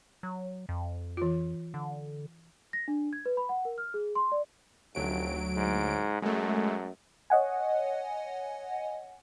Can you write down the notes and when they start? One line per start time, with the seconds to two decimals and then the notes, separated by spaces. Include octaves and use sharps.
0.23 F#3
0.69 F2
1.17 E3 F4
1.74 D3
2.73 A#6
2.88 D4
3.13 G#6
3.26 B4
3.37 B5
3.49 F#5
3.65 A#4
3.78 F6
3.94 G#4
4.15 C6
4.32 D5
4.95 F1 D2 F#3 D7
5.56 G#2
6.22 F#2 G#3 A3
7.30 C#5 D#5 F#5 G#5